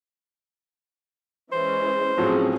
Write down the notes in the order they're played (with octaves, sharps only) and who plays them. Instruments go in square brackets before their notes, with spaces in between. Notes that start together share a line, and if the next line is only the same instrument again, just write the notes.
[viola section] E3 G#3 C#4 [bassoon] C5
[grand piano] A2 F3 F#3 [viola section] C4 C#4 G#4